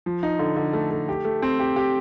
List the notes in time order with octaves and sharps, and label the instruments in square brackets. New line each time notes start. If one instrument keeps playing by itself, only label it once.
[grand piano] F3
D#4
D3
D3
A3
A3
G4
A3
C4
G4
G4